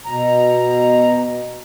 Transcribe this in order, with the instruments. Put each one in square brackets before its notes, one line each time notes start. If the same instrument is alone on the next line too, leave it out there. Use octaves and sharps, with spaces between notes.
[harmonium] B2 A#5